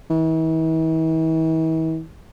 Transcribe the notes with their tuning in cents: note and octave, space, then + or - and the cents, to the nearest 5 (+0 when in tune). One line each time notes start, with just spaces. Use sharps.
E3 -45